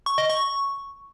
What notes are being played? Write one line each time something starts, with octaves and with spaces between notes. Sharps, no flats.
C#6
D#5
C#6